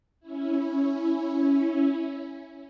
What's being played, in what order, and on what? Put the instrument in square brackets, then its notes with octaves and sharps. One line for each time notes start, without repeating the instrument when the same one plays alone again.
[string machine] C#4 E4